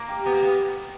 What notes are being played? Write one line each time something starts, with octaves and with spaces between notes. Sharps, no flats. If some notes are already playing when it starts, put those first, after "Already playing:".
Already playing: A#3
G4
B3 G4
A#3
B3